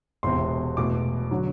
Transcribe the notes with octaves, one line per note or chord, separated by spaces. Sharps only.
E1 E2 C3 C6
E2 B2 A3 D6
D3 F#3